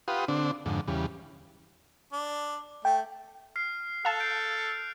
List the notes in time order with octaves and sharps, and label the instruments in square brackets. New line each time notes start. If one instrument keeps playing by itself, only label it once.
[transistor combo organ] F4 G4 B4 F#5 C6 D#6
D3 C4 D4
F2 G#2 D3
E2 C#3 G3
[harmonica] D4
[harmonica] A3 [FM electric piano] G5
[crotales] F6 C7
[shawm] A4 [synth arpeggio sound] F5 A5 [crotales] F#6 F7
[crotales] G6 C7 D7